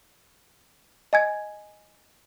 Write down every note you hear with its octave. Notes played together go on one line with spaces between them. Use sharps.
D#5 G#5 G#6